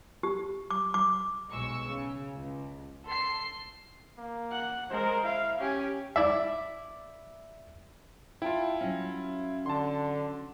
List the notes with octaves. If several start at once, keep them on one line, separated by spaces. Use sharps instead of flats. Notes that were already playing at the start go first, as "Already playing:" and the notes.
G4
D6
D6
B1 G#3 C#6 E6
C#3
C#2
A4 C6 C7
A#3
F#5
G#3 A#4 C5
E4 F5
C#4 G4 G#5
E4 D5 E5
E4 F4 G5 A5
F#3 C#4
D3 A5 C6